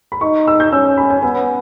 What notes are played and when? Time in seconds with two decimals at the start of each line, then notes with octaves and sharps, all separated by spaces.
0.12 B5
0.21 D#4 C#6
0.48 E6
0.60 G6
0.72 C#4 E6
0.98 B5
1.10 G#5
1.22 B3 G#5